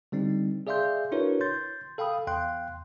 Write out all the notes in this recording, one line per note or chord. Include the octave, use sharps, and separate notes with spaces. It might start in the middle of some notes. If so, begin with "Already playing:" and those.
D3 G3 C4 D#4
G#4 D5 E5 F5 C6 G6
D4 E4 F#4 A#4 B4 C#5
C6 G6 A6
A4 F5 G5 B5 D#6
E2 F5 G5 C6 F#6